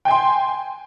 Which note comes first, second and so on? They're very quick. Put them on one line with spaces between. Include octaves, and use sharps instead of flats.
G5 G#5 C6